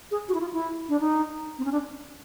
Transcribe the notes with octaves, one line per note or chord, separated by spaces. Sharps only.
G#4
F#4
E4
F4
E4
D4
D#4
C4
C#4
D4